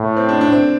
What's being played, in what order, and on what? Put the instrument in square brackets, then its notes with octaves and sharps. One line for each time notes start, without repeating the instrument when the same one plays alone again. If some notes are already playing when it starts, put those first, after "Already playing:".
Already playing: [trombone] A2
[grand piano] C4
D4
D4
C4